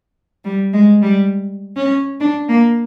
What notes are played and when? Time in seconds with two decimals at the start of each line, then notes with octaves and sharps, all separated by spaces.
0.44 G3
0.73 G#3
1.02 G3
1.76 C#4
2.20 D4
2.49 A#3